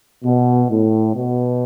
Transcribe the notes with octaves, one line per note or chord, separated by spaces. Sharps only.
B2
A2
B2